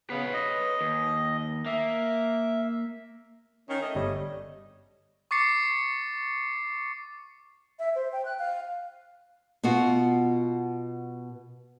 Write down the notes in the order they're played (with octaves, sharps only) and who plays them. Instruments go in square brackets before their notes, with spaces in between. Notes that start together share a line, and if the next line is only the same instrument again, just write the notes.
[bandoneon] C#3 B3 [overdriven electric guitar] B4 C#5
[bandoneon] D#5
[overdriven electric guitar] D#2
[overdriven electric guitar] A#3 [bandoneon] E5
[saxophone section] D#3 C#4
A3 D#5
[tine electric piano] G1 G3 C#5
[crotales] C#6 D6 A6 C7 C#7
[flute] E5
C5
G5
F#6
F5
[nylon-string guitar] B2 B3 F4 F#4